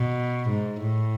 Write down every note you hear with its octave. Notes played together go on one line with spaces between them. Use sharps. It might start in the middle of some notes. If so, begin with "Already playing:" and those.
Already playing: B2
G#2
A2